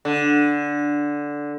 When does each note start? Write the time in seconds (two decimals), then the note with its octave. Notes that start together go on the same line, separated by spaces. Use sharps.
0.05 D3